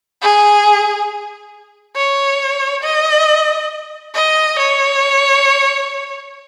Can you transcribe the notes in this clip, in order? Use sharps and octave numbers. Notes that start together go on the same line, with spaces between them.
G#4
C#5
D#5
D#5
C#5